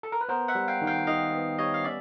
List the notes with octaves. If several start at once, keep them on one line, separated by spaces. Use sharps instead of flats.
A4
A#4
B4
B3 A#4 C5
E5 F#5
G3
F5 G5
D#3
F5 G5
D#3 D#5 F5
B3
G3 C#5 D#5
F5
C#4 D5 E5